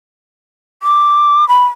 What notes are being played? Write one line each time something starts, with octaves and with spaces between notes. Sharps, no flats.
D6
B5